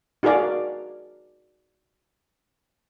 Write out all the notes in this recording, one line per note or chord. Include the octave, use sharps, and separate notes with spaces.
D#4 F#4 G#4 A#4 D5 F5